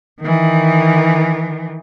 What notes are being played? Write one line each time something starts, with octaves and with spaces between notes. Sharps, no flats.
D#3 E3